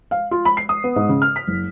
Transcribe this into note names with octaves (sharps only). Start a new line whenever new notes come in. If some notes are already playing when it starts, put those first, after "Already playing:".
F5
F4
B5
C7
D#6
B3
G#2
C#3
F6
B6
F#1